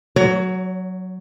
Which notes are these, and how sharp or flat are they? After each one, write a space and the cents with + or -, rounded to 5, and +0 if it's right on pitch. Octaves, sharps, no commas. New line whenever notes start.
F#3 +0 C#5 +35